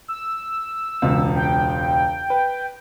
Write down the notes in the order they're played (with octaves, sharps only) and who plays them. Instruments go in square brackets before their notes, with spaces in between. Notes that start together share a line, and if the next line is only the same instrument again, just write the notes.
[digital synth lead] E6
[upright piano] E1 C#2
[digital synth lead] G5
[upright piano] B4